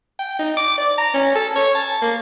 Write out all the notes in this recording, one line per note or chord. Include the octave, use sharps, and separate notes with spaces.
G5
D#4
D6
D5
A#5
C#4
A4
C#5
A5
A#3